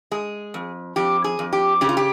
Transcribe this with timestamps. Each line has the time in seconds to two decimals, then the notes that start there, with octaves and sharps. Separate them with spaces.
0.11 G#3 G#4
0.54 F2
0.96 F2 G4
1.24 G#4
1.39 F2
1.53 G4
1.81 C#3 G4
1.89 F4
1.97 G4